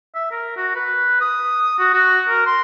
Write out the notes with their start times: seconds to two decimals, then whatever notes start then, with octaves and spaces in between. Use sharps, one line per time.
0.15 E5
0.31 A#4
0.57 F#4
0.76 B4
1.21 D#6
1.79 F#4
1.94 F#4
2.28 A#4
2.47 C6